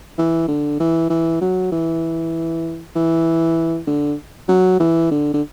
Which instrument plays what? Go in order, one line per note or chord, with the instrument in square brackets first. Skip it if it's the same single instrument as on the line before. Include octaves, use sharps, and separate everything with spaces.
[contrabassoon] E3
D3
E3
E3
F#3
E3
E3
D3
F#3
E3
D3
D3